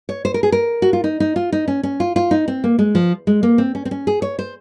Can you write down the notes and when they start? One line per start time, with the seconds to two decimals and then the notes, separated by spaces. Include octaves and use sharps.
0.09 C#5
0.25 C5
0.34 A#4
0.43 G#4
0.52 A#4
0.82 F#4
0.93 F4
1.04 D#4
1.20 D#4
1.36 F4
1.52 D#4
1.68 C#4
1.83 C#4
2.00 F4
2.16 F4
2.31 D#4
2.48 C4
2.64 A#3
2.79 G#3
2.95 F3
3.27 G#3
3.43 A#3
3.58 C4
3.75 C#4
3.85 C4
3.91 C#4
4.07 G#4
4.22 C#5
4.39 C5